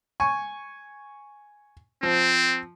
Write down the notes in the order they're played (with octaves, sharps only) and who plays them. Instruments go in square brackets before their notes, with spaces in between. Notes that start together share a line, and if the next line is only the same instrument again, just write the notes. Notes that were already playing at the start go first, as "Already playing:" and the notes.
[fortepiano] G#5 C#6
[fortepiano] F3 [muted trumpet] C4